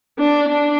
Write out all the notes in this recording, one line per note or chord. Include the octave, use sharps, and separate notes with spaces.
D4
D4